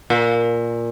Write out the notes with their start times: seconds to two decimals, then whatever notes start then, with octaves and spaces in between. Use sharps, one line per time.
0.10 A#2